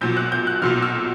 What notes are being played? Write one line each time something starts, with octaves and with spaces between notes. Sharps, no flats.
B1 A#2 F#3 G6
F#6
G6
F#6
B1 A#2 F#3 F6
E6